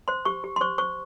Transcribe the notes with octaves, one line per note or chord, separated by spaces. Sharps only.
C5 C6
G4 C#6
G4
C6
C5 C#6
C5 C#6